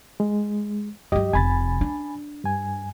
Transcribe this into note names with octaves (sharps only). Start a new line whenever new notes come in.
G#3
G2 F#3 G4 D#5
F1 C3 G#5 B5 A6
D4
G2 G#5